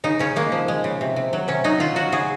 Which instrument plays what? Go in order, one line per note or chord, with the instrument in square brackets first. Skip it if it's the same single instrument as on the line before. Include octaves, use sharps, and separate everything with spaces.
[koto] C#3 D#4
C#3 C#4
G#3 A#3
F3
G#3
C#3
C3
C3
F#3
C3 C#4
F#3 D#4
F#3 F4
F#3 F#4
C#3 G#4